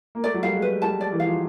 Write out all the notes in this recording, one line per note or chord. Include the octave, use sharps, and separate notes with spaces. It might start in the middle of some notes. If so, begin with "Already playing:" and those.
A#3
A3 D5
F#3
G3 F5
G#3
B4
G3 A5
D5
E3
F5
F3